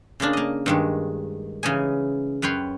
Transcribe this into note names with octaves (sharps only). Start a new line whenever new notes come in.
C#3 G#3 A#3 D4
A#3 D#5
G2 D#3 G#3
C#3 E3 D#4 G#5
F#2 B4 C#5 G5 C6